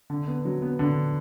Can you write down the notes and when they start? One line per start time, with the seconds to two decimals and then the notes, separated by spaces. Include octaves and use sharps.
0.10 D3
0.27 B3
0.45 F#3
0.62 B3
0.79 D3